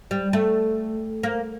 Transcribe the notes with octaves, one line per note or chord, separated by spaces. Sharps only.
G3
A3
A#3